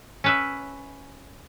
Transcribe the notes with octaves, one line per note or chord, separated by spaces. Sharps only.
C#4 B4 E5